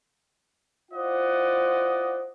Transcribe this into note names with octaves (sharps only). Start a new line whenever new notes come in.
E4 F4 C5 D5 D#5 F#5